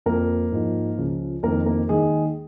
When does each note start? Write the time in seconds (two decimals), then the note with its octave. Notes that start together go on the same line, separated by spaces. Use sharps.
0.06 F2 F3 A#3 A#4
0.52 G#2 F3
0.98 C#2 C#3 F3
1.43 F2 D#3 A#3 A#4
1.66 A#3 A#4
1.89 D#2 D#3 G#3 G#4